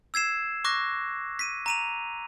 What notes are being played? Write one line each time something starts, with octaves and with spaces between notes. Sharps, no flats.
E6 G#6 C7 E7
C#6 D6 F#6 A#6
B6 D#7
A#5 D#7 F7